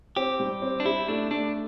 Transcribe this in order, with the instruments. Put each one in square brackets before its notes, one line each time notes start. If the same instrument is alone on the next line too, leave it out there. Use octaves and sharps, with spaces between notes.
[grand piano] C4 [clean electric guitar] G4
[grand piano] G3
C4
[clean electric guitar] D4
[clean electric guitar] E4 [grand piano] G4
[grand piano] A3 [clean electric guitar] D4
[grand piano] A3 [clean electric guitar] D4